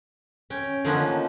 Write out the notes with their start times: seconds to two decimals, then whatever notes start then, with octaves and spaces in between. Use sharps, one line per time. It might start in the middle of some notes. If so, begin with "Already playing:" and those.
0.50 C#4 G5
0.84 D3 F3 A#3 B3 C#4 D#4